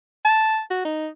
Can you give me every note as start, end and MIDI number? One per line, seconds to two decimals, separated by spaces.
0.25 0.60 81
0.70 0.83 66
0.85 1.08 63